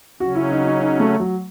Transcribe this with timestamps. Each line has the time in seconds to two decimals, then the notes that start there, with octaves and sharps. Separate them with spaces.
0.20 C#3 F#3 C#4 F#4
0.35 E4
0.51 D#4
0.65 D#4
0.80 D#4
1.00 A3
1.20 F#3